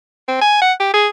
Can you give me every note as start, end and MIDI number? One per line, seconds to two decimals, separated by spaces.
0.28 0.40 60
0.41 0.61 80
0.62 0.73 78
0.80 0.90 67
0.94 1.08 68